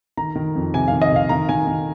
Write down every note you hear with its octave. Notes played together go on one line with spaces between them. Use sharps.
D#3 A#5
D#3
F2
C3 G#5
D#3 F5
D#5
C3
F5
D#3 A#5
D#3 G#5
D#3